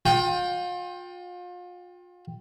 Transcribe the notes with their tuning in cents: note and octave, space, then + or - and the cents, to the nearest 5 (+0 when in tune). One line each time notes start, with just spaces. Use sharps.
F4 +35 G5 +0